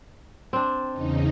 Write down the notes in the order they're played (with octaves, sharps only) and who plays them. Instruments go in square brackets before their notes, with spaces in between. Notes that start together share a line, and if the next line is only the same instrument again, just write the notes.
[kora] C4 D4
[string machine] E2 C#3 D#4